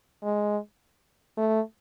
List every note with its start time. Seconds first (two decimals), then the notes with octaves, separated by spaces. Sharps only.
0.23 G#3
1.37 A3